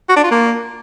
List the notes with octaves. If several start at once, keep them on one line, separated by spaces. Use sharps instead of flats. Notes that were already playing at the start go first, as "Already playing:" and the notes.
F#4
D4
F4
A#3